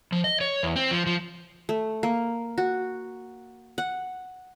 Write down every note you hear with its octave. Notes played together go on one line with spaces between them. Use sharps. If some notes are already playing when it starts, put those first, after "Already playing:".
F3
D#5
C#5
E2
C4
F3
F3
A3
A#3
F#4
F#5